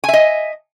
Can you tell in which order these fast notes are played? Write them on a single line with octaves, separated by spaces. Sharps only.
G#5 E5 D#5